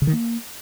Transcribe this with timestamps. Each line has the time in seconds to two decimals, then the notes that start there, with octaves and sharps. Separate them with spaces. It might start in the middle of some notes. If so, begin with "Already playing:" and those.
0.02 C#3
0.07 D#3
0.13 A#3